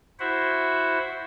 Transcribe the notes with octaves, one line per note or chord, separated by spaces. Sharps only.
E4 F#4 C5 E5 F#5